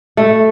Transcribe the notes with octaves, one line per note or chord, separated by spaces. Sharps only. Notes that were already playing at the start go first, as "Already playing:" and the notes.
A3